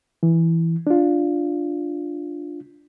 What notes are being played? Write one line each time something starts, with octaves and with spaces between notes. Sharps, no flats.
E3
D4 F4